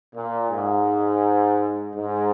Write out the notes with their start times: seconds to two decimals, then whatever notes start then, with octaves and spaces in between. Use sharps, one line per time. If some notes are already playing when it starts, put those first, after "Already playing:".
0.15 A#2
0.50 G#2
1.95 G#2